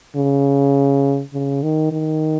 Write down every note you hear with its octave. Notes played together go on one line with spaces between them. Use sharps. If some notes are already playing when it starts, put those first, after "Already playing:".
C#3
C#3
D#3
D#3